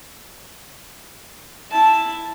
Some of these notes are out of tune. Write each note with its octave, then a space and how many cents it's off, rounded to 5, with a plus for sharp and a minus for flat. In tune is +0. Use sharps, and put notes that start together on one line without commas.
E4 +0 A5 +0